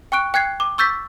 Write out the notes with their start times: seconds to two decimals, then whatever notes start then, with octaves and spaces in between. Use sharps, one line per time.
0.12 G5 C#6 F#6 D7
0.34 G5 F#6 G#6 C7
0.60 D6
0.78 C#6 E6 G6 A6 B6